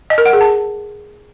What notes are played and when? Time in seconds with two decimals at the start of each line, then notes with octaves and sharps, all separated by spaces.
0.10 D#5
0.18 A#4
0.26 F#5
0.33 G#4
0.41 A5